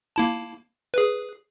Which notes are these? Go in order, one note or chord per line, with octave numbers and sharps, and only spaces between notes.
A#3 E4 A5
G#4 B4